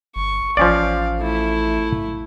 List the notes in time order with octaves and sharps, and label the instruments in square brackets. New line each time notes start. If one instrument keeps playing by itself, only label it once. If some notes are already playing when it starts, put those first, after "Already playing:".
[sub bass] G1 [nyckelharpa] C#6
[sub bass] A1 [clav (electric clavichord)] F3 C#4 D5 [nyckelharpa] F5
[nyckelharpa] A3 E4